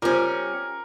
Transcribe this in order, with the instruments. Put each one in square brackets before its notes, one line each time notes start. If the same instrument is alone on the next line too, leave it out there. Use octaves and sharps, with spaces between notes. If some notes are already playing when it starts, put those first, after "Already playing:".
[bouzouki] G3 C#4 [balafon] F4 C5 [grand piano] A#4